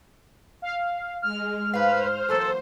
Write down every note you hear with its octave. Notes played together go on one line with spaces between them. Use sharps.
F5
G#3 F6
G#2 B4 C5 F5
E3 F#3 A#3 A4